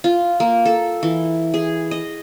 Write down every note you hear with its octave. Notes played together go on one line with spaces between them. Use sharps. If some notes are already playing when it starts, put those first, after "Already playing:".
F4
A#3
A4
E3
G#4
D#5